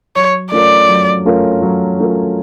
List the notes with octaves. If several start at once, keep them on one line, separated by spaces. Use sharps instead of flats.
F#3 C#5
A3 C#4 F4 A#4 D5
F#3
A3 C#4 F4 A#4
F#3
A3 C#4 F4 A#4